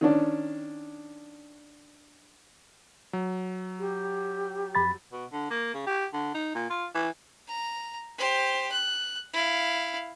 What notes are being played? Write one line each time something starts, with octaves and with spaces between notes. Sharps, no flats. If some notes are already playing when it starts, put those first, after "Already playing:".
D#3 C#4 D4
F#3
G4
F2 B5 A6
B2
D3
A#3
C#3
G4
D3
D#4
A#2
F4
E3
A#5
G4 C5
F#6
E4 F5